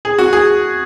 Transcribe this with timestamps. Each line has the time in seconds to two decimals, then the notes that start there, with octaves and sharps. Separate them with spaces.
0.05 G#4
0.18 F#4
0.33 G#4